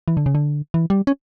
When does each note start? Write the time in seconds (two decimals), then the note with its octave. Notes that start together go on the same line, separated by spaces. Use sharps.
0.08 E3
0.17 D3
0.26 C#3
0.35 D3
0.74 E3
0.90 G3
1.07 C#4